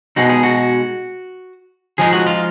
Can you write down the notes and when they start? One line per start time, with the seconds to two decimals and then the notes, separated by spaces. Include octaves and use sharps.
0.16 B2 G#3 D#4 F#4
0.29 G#4
0.43 F#4
1.98 F3 G#3 B3 D#4 G#4
2.12 F#4
2.27 F4